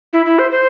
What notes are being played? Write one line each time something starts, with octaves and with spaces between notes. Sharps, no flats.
E4
E4
C5
C5